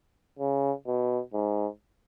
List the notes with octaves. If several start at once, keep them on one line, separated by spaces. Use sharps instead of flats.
C#3
B2
G#2